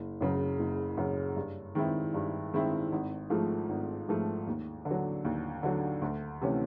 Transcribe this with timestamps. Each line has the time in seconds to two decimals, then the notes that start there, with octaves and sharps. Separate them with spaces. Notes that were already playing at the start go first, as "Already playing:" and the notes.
Already playing: F#1
0.21 F#2 C#3 F#3
0.59 F#1
0.97 F#2 C#3 F#3
1.36 G2
1.75 D#3 G#3 C4 E4
2.14 G2
2.53 D#3 G#3 C4 E4
2.92 G#1
3.30 G#2 F3 A3
3.69 G#1
4.09 G#2 F3 A3
4.47 D#2
4.85 D3
4.91 F#3
5.25 D#2
5.63 D3 F#3
6.02 D2
6.42 C3 E3 A3 C#4